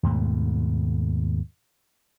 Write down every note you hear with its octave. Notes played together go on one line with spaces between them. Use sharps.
D#2 G#2 B2 A3